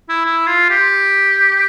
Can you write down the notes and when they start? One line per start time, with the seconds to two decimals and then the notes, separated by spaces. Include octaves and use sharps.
0.09 E4
0.26 E4
0.47 F4
0.70 G4